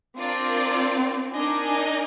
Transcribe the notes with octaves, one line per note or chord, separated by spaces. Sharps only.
C4 D4 F4 A#4 D5
D4 D#4 A#4 D#5 G#5